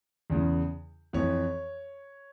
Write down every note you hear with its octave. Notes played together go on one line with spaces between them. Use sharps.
E2 C#3 E3
F2 E3 C#5